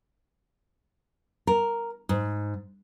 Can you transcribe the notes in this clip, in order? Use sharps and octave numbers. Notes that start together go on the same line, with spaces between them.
A#4
G#2